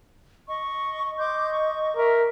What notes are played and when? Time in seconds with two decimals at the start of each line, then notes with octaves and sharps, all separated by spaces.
0.47 D#5 C#6
1.19 D#5 C6 D6 G6
1.52 C#6
1.96 A#4 E5